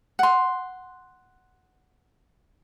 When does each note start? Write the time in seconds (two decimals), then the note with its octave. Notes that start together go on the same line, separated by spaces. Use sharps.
0.19 F#5 C6